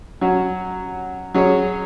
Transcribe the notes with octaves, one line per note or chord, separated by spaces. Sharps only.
F#3 C#4 F#4
F#3 C#4 G#4 C#5